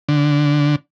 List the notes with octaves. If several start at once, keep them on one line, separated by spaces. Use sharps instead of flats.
D3